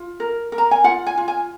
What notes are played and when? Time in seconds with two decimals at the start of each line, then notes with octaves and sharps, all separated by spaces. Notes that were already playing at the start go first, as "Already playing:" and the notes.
Already playing: F4
0.20 A#4
0.52 A#4
0.58 A#5
0.71 G#5
0.84 F4 F#5
1.07 G#5
1.18 F4
1.28 G#5